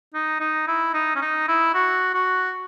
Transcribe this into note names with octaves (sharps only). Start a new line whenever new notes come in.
D#4
D#4
E4
D#4
C#4
D#4
E4
F#4
F#4